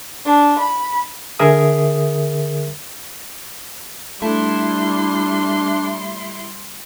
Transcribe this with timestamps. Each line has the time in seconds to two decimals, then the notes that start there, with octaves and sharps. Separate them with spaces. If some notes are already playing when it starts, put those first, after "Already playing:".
0.25 D4
0.59 B5
1.39 D3 G#4 A#4 E5 D#6
4.22 G3 A3 D4 E4 C6